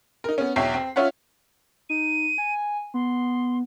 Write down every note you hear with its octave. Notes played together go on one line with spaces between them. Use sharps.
D#4 A#4
B3 C#4
B1 E2 C#5 E5 G5 C7
C4
C#4 F4 C#5 E5 F#5
D#4 D#7
G#5
B3 C6